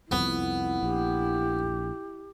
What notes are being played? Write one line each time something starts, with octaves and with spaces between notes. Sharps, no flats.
C2 F2 B3 E4
A#1 G4